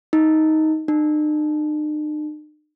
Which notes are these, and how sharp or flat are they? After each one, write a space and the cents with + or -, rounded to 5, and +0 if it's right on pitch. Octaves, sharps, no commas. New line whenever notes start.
D#4 +10
D#4 -45